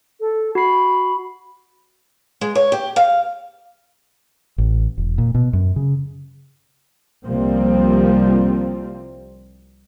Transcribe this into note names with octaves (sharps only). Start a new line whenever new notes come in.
A4
F#4 B5 C7
G#3
C#5
G4
F5
A1
E1
A#2
B2
F#2
C#3
C2 C3 F3 G3 A#3 C4